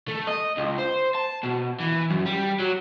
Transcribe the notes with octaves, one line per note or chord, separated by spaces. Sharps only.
A3
D#5
C#2
C5
A5
B2
E3
F#2
G3
F#3